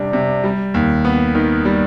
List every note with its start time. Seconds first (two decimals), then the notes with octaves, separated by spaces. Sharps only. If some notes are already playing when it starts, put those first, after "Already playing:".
Already playing: C3 G3 D4
0.13 C3
0.44 G3
0.74 D#2
1.05 B3
1.35 D#3
1.65 G3